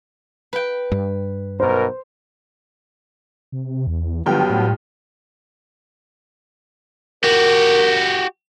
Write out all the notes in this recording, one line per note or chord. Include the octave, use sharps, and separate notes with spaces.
B4 G5
G2
B1 B2 A#4 C5
C3
E2
G2 D3 F3 F#3 B3 G5
A2
F#4 G4 A#4